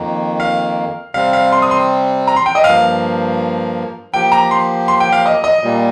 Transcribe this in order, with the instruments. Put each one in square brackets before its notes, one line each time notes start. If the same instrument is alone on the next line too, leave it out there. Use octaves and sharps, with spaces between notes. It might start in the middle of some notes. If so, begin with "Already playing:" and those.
Already playing: [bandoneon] F2 D#3 A#3
[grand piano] F5
[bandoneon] C3 G3 C4 [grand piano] F5
[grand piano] F5
C6
D#6
C6
A#5
C6
G5
D#5
[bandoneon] G2 F3 A#3 [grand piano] F5
[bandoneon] F3 A#3 G4 [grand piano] G5
[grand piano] A#5
C6
C6
G5
F5
D#5
D#5
[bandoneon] A#2 G3 A#3